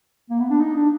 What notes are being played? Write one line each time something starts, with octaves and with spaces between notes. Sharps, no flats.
A#3
B3
D4
D#4
D4